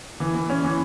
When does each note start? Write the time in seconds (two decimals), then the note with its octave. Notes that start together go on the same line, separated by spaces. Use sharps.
0.20 E3
0.35 E3
0.50 C#4
0.65 E3